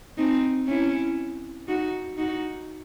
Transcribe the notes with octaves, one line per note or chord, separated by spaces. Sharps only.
C4 D#4
C#4 E4
D#4 F#4
D#4 F#4